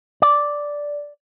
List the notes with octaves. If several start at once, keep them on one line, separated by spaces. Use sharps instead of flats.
D5